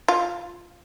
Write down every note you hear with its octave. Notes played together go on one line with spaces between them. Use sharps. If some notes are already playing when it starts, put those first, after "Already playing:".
F4